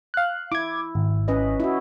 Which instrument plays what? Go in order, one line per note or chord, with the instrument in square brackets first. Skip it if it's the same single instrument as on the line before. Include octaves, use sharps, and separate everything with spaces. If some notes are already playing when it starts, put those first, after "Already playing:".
[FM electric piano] F5 F#6
[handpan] E4 [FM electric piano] D6 G#6
[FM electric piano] G#1
[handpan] C#4 B4 D#5
E4 F#4